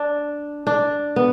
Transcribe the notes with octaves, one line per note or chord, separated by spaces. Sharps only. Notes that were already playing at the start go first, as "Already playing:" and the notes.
Already playing: D4
D4
B3